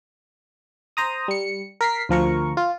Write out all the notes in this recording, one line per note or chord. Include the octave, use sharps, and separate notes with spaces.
C5 A#5 D#6
G3 C#7
A#4 B6 C7
D2 F3 A#4 C#6
F4